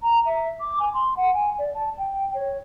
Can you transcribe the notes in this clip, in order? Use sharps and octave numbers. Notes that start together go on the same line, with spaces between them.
A#5
E5
D6
G#5
C6
F#5
G#5
D5
A5
G5
C#5